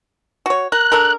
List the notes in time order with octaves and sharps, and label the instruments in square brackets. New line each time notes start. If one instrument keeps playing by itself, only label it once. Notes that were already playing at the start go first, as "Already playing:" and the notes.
[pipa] F#4 C#5
[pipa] A#4 [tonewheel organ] F#6
[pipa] D4 A4 A#4